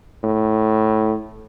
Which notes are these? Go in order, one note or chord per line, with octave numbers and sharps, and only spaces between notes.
A2